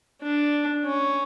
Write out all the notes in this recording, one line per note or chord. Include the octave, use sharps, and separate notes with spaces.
D4
C#4